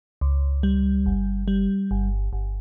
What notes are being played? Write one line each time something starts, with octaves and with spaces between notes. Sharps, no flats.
C#2
G3
G1
G3
G1
G1